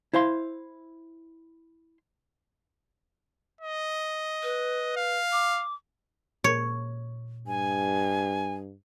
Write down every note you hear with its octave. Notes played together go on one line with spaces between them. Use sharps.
E4 C5 F5 C6
D#5
B4
F5
D6
A#2 C#5
G2 G#5